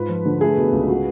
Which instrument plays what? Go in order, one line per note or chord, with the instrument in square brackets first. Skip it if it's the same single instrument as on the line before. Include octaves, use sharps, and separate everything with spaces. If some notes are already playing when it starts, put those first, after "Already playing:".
Already playing: [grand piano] G#2 F4 [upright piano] B4
[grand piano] F3
D3
[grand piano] A3 [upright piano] G#4
[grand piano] B2
C#2
F#4